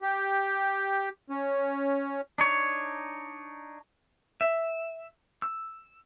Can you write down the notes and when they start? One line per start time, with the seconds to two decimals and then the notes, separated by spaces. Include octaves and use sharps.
0.02 G4
1.30 C#4
2.38 D4 D#4 C#5
4.41 E5
5.42 E6